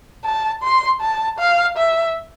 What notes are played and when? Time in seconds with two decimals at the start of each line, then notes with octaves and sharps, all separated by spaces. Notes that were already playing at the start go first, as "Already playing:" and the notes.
0.24 A5
0.63 C6
1.01 A5
1.39 F5
1.77 E5